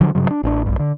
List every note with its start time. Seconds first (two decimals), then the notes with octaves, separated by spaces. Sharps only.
0.01 D3 F3 F#3
0.15 G2 C#3 F#3
0.31 D4
0.43 A1 C#4 D4
0.66 B1 G2
0.79 D3